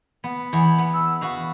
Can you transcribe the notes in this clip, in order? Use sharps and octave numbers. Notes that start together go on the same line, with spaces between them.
B3
E2 B5
B3
E6
B3 F#4 F5 B5